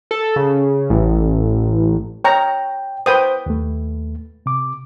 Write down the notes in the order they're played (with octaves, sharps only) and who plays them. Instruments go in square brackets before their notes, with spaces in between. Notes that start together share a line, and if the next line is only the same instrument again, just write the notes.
[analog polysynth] A4
C#3
A1
[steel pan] C#5 A#5 [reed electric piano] G5
[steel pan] B4 G5 D#6 [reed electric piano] C5
[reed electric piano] D#2 A3
C3 D6